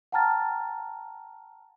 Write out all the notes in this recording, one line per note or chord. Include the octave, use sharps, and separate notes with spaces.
F#5 G5 A5 A#5 F6 A6